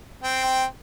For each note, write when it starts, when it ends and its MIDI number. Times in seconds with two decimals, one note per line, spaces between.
0.23 0.64 60
0.23 0.64 79